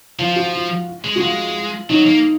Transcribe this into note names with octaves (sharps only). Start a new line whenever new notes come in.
F3 F4
F#4
F4
G#3
F#4
G#3 F4
F#3 D#4
A#3